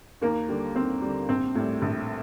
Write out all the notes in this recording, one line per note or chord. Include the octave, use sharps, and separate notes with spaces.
D#2 A#3
D3 G3
D#2 C4
D3 G3
A#1 C4
A2 G3
A#1